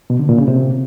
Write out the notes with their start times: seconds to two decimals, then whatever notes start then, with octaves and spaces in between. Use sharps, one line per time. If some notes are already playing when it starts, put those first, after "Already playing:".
0.10 B2
0.19 D3
0.29 A#2
0.38 C#3
0.48 C3